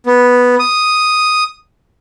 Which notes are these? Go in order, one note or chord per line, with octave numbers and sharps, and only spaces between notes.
B3
D#6